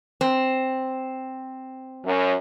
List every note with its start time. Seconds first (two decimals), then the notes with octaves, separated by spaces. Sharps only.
0.21 C4
2.05 F#2